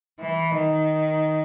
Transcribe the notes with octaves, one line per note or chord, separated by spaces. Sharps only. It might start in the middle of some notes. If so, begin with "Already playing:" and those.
E3
D#3